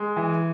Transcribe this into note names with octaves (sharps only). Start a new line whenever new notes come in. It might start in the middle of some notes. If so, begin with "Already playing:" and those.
Already playing: G#3
E3